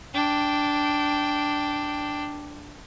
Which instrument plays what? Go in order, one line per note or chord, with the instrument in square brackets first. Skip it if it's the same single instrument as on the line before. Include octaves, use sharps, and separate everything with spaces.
[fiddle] D4 G5